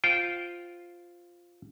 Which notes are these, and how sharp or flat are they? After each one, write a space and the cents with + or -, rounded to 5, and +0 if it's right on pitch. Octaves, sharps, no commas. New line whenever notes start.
F4 +0 C5 -5 G5 -20